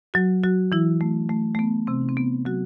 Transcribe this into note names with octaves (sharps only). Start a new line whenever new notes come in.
F#3 F#4
F#3 F#4
E3 E4
A3
A3
A3
B3
C3 C4
D#4
C4
B3
F#3 F#4